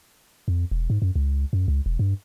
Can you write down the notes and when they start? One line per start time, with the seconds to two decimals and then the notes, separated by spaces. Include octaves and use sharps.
0.48 F2
0.71 E1
0.90 G#2
1.02 F#2
1.16 C#2
1.53 F#2
1.68 C#2
1.86 E1
1.99 G2